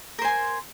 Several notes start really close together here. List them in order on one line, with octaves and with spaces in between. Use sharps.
A#4 C5 G#5 C6